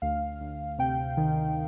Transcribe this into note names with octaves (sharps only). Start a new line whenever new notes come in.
D2 F5
D2
C3 G5
D#3